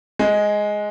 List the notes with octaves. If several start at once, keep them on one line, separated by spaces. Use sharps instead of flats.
G#3